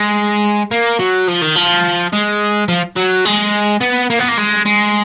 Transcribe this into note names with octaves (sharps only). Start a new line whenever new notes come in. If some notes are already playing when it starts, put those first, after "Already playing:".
Already playing: G#3
A#3
F#3
F3
D#3
F3
G#3
F3
F#3
G#3
B3
A#3
B3
A#3
G#3
G#3